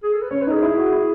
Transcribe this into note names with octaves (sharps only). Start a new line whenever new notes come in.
G#4
A4
B4
C#4 C#5
B4
D#4 G#4
E4
F#4
E4